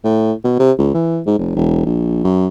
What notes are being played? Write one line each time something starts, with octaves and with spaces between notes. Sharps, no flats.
A2
B2
C3
C#2
E3
G#2
F1
E1
A#1
F#2